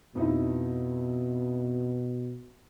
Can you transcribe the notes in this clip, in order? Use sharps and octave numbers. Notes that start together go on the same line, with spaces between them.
F2 B2 D#4 E4